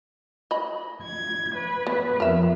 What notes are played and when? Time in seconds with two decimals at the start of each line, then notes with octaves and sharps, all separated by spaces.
0.51 D#5 B5
1.03 G#6
1.56 B4
1.87 B3
2.20 F2 A#4 E5